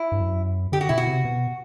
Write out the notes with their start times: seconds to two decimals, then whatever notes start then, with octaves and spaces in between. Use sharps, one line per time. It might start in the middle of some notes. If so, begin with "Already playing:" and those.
Already playing: E4
0.12 G2
0.20 F#2
0.72 D3 G4
0.81 F#4
0.89 B2 E4
0.98 F#4
1.07 C3
1.25 B2